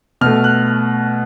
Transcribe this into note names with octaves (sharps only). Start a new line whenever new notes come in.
B2 A3 F6
F#6